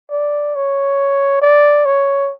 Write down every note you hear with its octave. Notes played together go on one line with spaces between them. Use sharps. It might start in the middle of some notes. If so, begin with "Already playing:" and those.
D5
C#5
D5
C#5